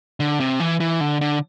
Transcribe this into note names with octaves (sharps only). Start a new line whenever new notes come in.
D3
C3
E3
E3
D3
D3